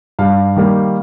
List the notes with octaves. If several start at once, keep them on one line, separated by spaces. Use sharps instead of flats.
G2 F5
D#3 G3 A#3